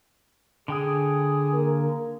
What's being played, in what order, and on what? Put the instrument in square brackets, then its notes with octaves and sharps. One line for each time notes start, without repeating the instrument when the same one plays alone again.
[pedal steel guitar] D3 G5 D#6 [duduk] G#4
[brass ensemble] A#3 A#4